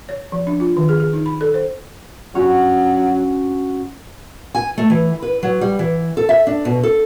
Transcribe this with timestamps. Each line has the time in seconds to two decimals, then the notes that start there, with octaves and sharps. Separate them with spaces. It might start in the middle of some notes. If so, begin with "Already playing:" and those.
0.09 C#5
0.32 F3
0.47 D4
0.60 F4
0.77 D#3
0.89 G#4
1.00 G#4
1.13 D#4
1.26 B5
1.41 A4
1.54 C5
2.35 G2 F#3 C#4 F#4
4.55 G#5
4.78 A3
4.90 E3
5.22 B4
5.43 F#3
5.61 G3
5.79 E3
6.17 A4
6.29 E5
6.47 D4
6.65 B2
6.83 A4